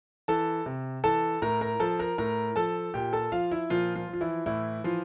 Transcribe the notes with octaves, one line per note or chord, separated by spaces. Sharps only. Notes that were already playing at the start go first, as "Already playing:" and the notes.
E3 A4 A5
C3
E3 A4 A5
A2 A#4 A#5
A#4 A#5
F3 A4 A5
A#4 A#5
A2 A#4 A#5
F3 A4 A5
A#2 G4 G5
A4 A5
F3 F4 F5
E4 E5
A#2 F3 F4
F3 F4
F3 F4
E3 E4
A2 E3 E4
E3 F3 F4